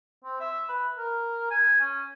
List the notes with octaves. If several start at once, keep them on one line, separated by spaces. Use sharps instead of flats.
C4
E5
B4
A#4
G#5
C#4